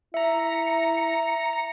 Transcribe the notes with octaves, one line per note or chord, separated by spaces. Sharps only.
E4 E5 A#5 C#7